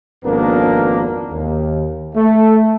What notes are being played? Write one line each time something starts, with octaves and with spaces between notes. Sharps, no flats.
G#1 F2 A#3 B3 D4 A#4
D#2
A3